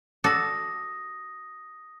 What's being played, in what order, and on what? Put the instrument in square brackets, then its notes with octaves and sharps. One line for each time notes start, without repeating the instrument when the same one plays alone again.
[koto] F#4 A4 D5 [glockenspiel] D#6 A#6